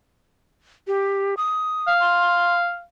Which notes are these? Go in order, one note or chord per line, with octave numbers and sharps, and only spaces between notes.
G4
D#6
F5
C6